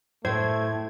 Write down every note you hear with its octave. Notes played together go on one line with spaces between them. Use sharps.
A2 A3 C5 G#6